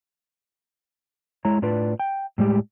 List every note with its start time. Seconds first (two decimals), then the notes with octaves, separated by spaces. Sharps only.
1.45 G#3 E4 C#5 A#5
1.62 A2 D4 F4 B4 D5
2.00 G5
2.38 A2 G3 G#3 G4